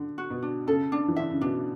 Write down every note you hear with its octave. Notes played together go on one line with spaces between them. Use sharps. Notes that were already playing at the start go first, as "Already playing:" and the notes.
Already playing: D3
F#4
B2
D4
C#3 A4
D4
E3
D3 E5
C#3
B2 D4